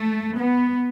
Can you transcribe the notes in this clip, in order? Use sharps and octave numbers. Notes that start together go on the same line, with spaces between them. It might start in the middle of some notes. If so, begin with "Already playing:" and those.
Already playing: A3
B3